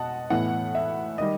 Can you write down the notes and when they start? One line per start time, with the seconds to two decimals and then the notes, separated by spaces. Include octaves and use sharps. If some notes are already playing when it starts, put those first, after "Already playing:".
Already playing: B2 D#5 F#5 A5
0.30 A2 E3 B3 F#5
0.75 E5
1.18 D#3 G3 D#5